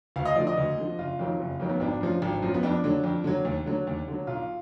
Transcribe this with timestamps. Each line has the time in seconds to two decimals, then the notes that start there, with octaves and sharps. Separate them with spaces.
0.16 D2 F5
0.25 D#5
0.36 D3 F3 D5
0.47 D#5
0.58 D2
0.78 D3 F3
0.98 F#1 F4
1.19 F2 D#3 F#3
1.40 F#1
1.60 F2 D#3 F#3
1.69 B3
1.80 G#1 D4
2.01 F#2 F3
2.22 G#1
2.42 F#2 F3
2.54 B3
2.63 F2 D4
2.84 D3 F#3
3.04 F2
3.24 D3 F#3
3.45 D#2
3.66 D3 F#3
3.87 D#2
4.08 D3 F#3
4.27 B1 F4